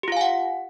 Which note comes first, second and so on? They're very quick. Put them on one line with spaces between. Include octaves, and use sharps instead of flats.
G4 F4 F5 G#5 F#5